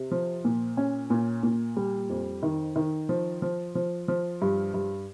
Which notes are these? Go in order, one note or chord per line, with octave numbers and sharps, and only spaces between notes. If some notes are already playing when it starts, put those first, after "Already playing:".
Already playing: C3
F3
A#2
C#4
A#2
A#2
G3
F2
D#3
D#3
F3
F3
F3
F3
G2
G2